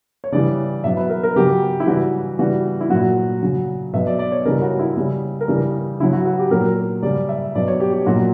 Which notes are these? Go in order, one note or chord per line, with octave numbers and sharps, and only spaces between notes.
C#5
C#3 E3 G3 D5
B2 F#3 E5
B4
A#4
A#4
C#3 F#3 G4
E4
C#3 E3 G3 F#4
C#3 E3 G3 F#4
E4
A#2 F#3 F#4
C#3 F#3
B2 F#3 E5
D5
D5
C#5
C#3 E3 G3 A#4
F#4
E4
C#3 G3
A#4
C#3 E3 G3 G4
C#3 F#3 E4
F#4
F#4
G4
A#2 F#3 A#4
C#3 G3 D5
E5
B2 F#3 D5
C#5
G4
G4
A#2 F#3 F#4